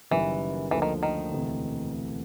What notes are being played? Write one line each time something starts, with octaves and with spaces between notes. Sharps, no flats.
F#1 F#2 D#3 E3 G3
D2 D3 E3 F3 A#3
D#3
D#3
E1 D2 C3 E3